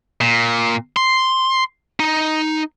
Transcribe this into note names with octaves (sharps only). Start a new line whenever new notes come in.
A#2
C6
D#4